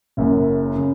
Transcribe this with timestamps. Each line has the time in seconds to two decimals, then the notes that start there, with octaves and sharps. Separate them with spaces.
0.17 F#1 F#2 C#3
0.76 C#3